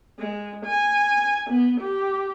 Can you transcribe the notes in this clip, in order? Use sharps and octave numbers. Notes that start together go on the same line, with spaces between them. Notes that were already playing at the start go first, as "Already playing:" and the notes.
G#3
G#5
B3
G4